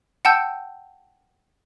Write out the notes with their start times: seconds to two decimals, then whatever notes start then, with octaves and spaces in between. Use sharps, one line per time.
0.25 F#5 G5 A5 E6 G6